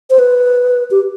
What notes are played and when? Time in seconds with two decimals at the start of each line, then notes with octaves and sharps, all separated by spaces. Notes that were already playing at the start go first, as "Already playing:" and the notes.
0.10 C5
0.19 B4
0.91 G4